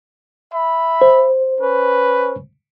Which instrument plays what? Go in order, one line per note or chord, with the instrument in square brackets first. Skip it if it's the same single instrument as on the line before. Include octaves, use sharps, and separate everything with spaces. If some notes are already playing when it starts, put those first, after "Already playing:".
[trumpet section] E5 B5
[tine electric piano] C5
[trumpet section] C#4 B4